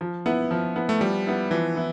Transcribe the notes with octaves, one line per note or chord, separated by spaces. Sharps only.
F3
B3 E4
F3
B3 E4
A3
F3 G3
B3 E4
E3 F3
B3 E4